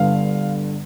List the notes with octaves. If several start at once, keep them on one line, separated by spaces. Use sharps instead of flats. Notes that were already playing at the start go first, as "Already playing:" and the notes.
Already playing: G1 G2 D3 F5